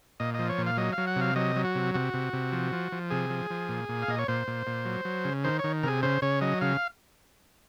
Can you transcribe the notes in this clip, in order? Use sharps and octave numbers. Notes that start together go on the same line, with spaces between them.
A#2 D#5
F3 D#5
C#5
A#2
F5
F#3 D#5
F5
F#3
F#5
C3 F5
F#3 D#5
F#3
F#4
C3
C3 F#4
C3
C3
F3
F3
F3
C3 G#4
F3
F3
A#2
A#2
F5
A#2 D#5
C#5
A#2 C5
A#2
A#2
F#3
F#3
C#3
D#3 C5
D#3 C#5
C3 G#4 A#4
C#3 C5
C#3 C#5
F#3 D#5
C#3 F5